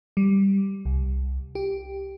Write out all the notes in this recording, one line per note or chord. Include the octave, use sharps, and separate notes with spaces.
G3
C2
G4